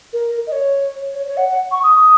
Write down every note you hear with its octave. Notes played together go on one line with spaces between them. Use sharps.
A#4
D#5
C#5
C#5
C#5
F#5
F#5
C#6
D#6